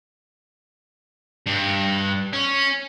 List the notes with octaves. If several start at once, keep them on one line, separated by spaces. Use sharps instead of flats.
G2
C#4